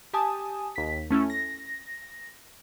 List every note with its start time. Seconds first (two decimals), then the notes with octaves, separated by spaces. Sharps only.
0.13 G4 G#5 A5 D#6
0.76 D#2 B6
1.10 A3 C#4 E4 A4
1.30 A#6